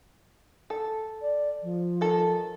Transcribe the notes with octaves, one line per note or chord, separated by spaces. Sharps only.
A4
D5
F3
D#3 A4